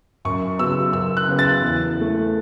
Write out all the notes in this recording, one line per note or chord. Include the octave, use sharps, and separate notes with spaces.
F#2 C#6
C#3 F#3 B3 E6
F#2 E6
F#6
C#3 F#3 B3
A6
E2
E3
A3